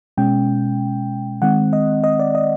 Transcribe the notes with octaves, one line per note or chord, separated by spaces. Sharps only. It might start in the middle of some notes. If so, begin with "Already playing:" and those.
B2 G#3 C#4 G5
D#3 G#3 C4 F#5
D#5
D#5
D5
D#5